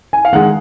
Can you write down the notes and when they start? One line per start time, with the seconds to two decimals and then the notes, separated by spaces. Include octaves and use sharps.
0.13 G#5
0.25 F5
0.33 D#3 G#3 F#5